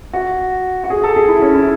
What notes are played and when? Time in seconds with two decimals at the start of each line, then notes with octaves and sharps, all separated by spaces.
0.13 F#4
0.84 F#4
0.90 G#4
1.04 A4
1.16 G#4
1.28 E4
1.42 C#4
1.55 E4